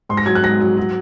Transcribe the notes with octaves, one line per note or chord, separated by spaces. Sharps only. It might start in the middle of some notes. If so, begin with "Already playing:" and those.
G#2 C6
A#6
F#3 G#6
F#6
G#2 A#6
F#3
F#3